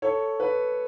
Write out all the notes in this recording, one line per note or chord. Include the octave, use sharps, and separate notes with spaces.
A4 C#5
B4